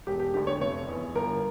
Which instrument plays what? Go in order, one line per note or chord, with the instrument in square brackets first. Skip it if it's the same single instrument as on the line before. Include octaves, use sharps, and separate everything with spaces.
[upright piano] E1 G4
G4
D2 D3 G4
C#5
F1 C#5
E2 E3
G1 A#4